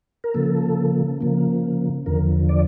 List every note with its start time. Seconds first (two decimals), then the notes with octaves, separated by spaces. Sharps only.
0.24 A#4
0.34 C#3 F3 A#3 A4
1.21 C#3 F3 A#3
2.06 E2 D3 F3 A#4
2.49 D5